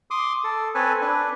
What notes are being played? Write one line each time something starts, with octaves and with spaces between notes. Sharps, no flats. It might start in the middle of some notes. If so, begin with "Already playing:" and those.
C6 D6 D#6
A4
C4 A4 B4 C#5 G#5
D4 B4